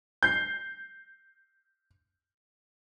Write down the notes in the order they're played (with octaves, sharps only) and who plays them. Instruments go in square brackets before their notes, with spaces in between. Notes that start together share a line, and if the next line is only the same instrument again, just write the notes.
[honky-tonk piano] G6 C7